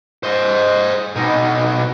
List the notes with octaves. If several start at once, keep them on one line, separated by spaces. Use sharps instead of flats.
C5 D#5
B2 D#4